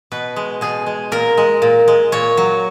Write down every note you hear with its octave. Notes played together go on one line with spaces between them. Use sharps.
B2 B4
G#3
B2 G#4
G#3
A#2 A#4
G#3
A#2
G#3
A#2 C#5
F#3